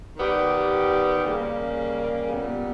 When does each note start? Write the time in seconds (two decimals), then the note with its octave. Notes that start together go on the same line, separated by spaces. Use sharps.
0.17 D#3 G3 B3 G4
1.25 C#3 G3 A#3
2.33 A#2 G3 B3